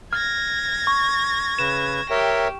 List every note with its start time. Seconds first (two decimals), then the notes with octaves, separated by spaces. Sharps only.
0.13 F6 G#6 A#6
0.87 C#6
1.59 C#3 B4 E7
2.10 G4 A#4 C#5 E5